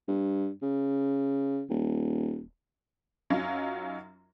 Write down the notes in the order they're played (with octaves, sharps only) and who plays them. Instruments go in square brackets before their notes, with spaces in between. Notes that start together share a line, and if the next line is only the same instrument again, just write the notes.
[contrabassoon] G2
C#3
D#1
[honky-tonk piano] F#2 F#3 C#4 D#4 F4